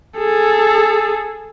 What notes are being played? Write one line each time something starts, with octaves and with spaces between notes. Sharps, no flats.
G#4 A4